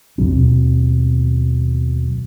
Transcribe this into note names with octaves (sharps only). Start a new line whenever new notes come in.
D#2 B2 F#3 C4